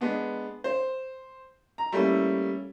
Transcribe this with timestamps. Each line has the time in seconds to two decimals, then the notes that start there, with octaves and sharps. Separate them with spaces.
0.01 G#3 B3 D4
0.64 C5
1.78 A#5
1.92 G3 A3 A#3 C#4 E4